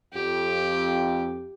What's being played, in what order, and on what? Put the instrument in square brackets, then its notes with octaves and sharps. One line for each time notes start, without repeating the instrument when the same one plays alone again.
[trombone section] F2 [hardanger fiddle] G4